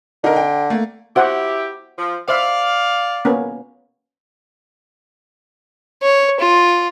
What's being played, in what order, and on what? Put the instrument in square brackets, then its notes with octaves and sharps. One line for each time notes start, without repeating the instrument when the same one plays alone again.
[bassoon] D3 [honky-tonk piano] D#4 A#4
[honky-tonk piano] G5
A3 A#3
[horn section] E4 G4 [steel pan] F#4 C5 F#5
[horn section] F3
[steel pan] C5 E5 [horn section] D5 F5
[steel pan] A#3 B3 C#4
[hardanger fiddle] C#5
F4